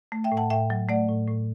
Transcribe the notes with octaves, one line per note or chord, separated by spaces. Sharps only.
A3
E5 G5
A2
F#5 A5
A2 E5 G5
F#3
A3 D5 F#5
A2
A2